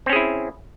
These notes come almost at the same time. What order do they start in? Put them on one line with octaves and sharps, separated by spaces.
C4 C#4 G#4 E4